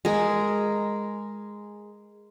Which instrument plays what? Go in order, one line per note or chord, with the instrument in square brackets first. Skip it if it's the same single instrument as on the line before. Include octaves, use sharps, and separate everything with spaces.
[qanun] G#3 A#4